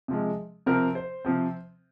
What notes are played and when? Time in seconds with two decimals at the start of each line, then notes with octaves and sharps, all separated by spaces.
0.08 C3 F3 G#3
0.66 C3 F3 C4 A#4
0.95 C5
1.25 C3 F3 C4